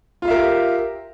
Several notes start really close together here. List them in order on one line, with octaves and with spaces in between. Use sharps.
F4 F5 E5 A#4 G4